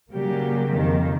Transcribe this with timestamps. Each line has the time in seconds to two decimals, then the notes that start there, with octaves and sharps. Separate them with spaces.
0.12 C#3 F#3 G3 A#3 G4
0.72 F2 D#3